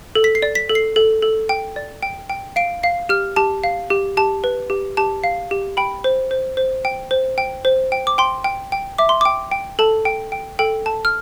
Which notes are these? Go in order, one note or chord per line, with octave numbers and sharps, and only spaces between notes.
A4
B6
C7
D5
B6
A4
C7
A4
A4
G5
D5
G5
G5
F5 D7
F5 C7
G4 F6
G4 A5
F5
G4
G4 A5
B4
G4
G4 A5
F5
G4
G5 B5
C5
C5
C5
G5
C5
G5
C5
G5
D6
G5 C6
G5
G5
E5 D6
C6
G5 D6
G5
A4 A5
G5
G5
A4 G5
A4 A5
F6